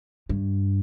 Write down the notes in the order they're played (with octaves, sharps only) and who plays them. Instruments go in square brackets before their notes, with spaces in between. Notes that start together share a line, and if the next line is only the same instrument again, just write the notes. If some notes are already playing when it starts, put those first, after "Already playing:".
[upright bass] G2